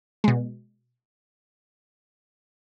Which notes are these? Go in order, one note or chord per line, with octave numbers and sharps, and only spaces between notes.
B2 G#3